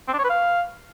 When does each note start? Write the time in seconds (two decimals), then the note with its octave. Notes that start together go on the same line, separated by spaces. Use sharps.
0.08 C4
0.13 D4
0.19 C#5
0.24 B4
0.30 F5